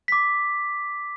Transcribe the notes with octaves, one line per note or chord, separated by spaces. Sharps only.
D6 B6